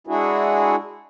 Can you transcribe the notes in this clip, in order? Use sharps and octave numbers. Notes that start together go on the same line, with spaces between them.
G#3 D4 E4 F#4 G#4